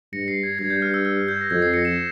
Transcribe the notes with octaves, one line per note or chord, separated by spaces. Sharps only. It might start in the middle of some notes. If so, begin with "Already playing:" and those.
G2 A#6 C#7
C7
G#6
G2 G#6
G6
F6
E6
F6
G6
A#6
F2 G#6
C7
A#6 C#7
C7 E7